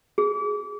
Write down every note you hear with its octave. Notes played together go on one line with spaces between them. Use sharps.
G#4